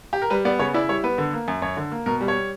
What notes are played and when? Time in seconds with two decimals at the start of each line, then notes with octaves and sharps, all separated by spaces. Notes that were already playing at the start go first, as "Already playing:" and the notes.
0.13 G4
0.22 A#4
0.30 G3 B4
0.45 B3 D5
0.59 C#3 C#5
0.74 E4 D5
0.89 G3 C#5
1.04 B3 B4
1.18 D3
1.33 A#3
1.48 F#2
1.62 F#2 C#5
1.77 D3
1.92 A#3
2.06 B2 A#4
2.21 G3
2.28 C#5